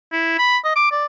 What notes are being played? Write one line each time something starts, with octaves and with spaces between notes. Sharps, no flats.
E4
B5
D#5
D6
D5